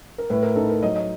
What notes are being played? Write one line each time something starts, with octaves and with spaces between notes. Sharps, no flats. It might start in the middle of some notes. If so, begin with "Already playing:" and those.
A#4
A2 B4
A#4
D#4 A4
A#4
F#3 D#5
D#5